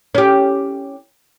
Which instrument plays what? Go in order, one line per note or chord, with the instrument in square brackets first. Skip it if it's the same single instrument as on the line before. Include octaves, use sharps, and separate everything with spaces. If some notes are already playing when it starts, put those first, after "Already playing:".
[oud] C#4 G4